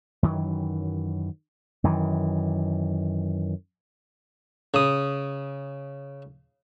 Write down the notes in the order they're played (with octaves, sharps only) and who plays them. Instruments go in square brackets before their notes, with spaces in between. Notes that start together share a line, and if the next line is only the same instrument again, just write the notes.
[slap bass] F#2 D#3 E3 F#3
F#2 D#3 E3
[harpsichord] C#3 D#6